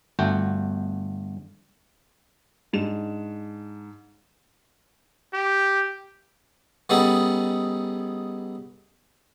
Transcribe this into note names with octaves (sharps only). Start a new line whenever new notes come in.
G1 A3 F#4 G5
G#2 D4 E7
G4
G3 B3 C#4 D#4 G#4 A4